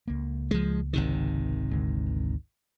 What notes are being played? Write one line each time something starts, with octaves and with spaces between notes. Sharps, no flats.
C#2 A#3
F3 G#3
G#1 C3 D#3
D2 D3 G#3